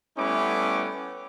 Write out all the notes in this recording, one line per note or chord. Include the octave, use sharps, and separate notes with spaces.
G3 A3 B3 C#4 E4 D6